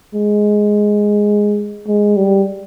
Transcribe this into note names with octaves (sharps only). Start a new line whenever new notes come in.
G#3
G#3
G3